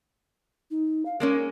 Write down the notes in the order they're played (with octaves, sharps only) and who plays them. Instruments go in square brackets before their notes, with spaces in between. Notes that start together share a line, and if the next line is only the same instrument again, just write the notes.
[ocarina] D#4
F5
[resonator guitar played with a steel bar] G#3 A#3 C#4 [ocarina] A#4